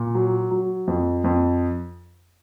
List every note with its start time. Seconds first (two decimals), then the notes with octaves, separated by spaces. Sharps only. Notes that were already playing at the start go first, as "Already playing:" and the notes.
Already playing: A#2
0.15 F#3
0.51 F#3
0.87 F2
1.24 F2